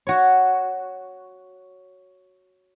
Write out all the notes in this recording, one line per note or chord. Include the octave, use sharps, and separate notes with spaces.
F#4 C#5